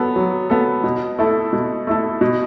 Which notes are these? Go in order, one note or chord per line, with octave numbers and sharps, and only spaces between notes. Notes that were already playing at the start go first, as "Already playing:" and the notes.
Already playing: F#3 B3 A4
F#3
B3 A4
B2
A3 E4 A4
B2
A3 E4 A4
B2